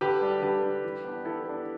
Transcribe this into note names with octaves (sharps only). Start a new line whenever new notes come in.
D3 G4 B4
G3 D4
D3 G4 B4
G3 D4
E3
B3 D4
E3 E4 A4
B3 D4